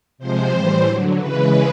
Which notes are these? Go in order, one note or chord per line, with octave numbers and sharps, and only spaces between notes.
C3 F3 G#3 C5
A2 E3 G3
D3 F#3
C#3 E3 G#3 B4